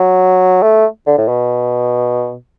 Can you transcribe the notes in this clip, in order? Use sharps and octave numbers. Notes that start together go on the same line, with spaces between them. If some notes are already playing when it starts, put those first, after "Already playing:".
Already playing: F#3
A3
D3
A2
B2